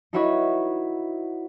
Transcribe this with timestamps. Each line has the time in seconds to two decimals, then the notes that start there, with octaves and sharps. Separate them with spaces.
0.13 D#4 E4 F#4 B4 C#5 C#6